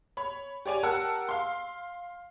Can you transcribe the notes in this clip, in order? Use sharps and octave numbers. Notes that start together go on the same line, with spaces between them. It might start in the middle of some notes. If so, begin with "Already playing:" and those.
C#5 B5
G4 C#5 D5 G#5
G4 A#4 F#5 A5 E6
F5 C6